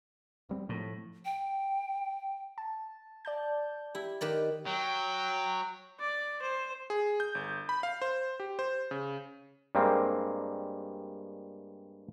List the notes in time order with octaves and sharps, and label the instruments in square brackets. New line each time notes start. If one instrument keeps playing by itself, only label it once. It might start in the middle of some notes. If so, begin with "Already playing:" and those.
[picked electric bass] D1 G3 C4
[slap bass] A2 [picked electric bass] F3
[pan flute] G5
[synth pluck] A5
D5 A5 G6
[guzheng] E4 [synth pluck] G4
[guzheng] D#3 B4 D5
[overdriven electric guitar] F#3 [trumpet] G5
[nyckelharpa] D5
C5
[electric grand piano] G#4
G6
G1
B5
F5
C5
G4
C5
C#3
[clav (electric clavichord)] G2 G3 G#3 A#3 C4